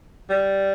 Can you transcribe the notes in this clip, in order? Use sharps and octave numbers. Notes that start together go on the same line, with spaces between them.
G3